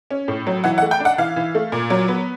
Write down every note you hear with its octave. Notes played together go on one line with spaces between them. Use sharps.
C#4
A2
F#3
E3 F#5
F#5
A3
G5
D4
F#5
E3 F5
E3
A3
A#2
F#3
B3